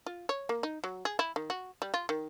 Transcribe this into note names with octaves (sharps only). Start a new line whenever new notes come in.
F4
C#5
A#3
D#4
F#3
G#4
E4
D#3
F#4
G3
F4
D#3